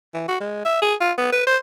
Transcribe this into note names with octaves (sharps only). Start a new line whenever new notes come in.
E3
F#4
G#3
E5
G#4
F4
B3
B4
C5